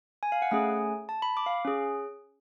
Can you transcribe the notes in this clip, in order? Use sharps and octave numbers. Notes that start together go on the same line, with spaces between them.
G#5
F5
F#5
A3 C#4 G#4 G#5
A5
B5
D6
F5
C#4 G#4